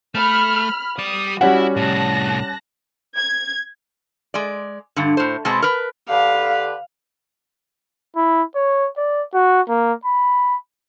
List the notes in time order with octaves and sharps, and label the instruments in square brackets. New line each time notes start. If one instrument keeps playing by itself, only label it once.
[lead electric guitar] A3 [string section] B5 F6
[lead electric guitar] G3 D5 [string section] D#6
[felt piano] G3 C#4 F#5 [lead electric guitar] E4 [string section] F#4
[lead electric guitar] C2 A2 [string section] A5 F#6 A#6
[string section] G#6
[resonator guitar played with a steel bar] G#3 D5
G2 D3
A2 C5
B2 G#3 B3 C4 A5
A#4 B4
[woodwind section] D3 G4 B4 [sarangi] F5
[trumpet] E4
C#5
D5
F#4
A#3
B5